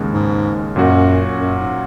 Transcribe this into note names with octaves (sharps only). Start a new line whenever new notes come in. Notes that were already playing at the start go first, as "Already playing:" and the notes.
Already playing: D#2 C#3 G#3
G#2
F#2 A#2 F#3 C#4 F#4
F#2
G#2